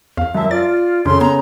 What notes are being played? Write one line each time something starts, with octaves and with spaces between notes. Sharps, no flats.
E2 F5
F#2 E5 A5
F4 D5 A6
F2 C#3 C#4 A4 C6
B3 A#5